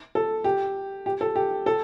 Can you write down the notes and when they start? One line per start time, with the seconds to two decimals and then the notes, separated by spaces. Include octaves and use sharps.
0.15 A4
0.44 G4
1.06 G4
1.21 A4
1.36 G4
1.66 A4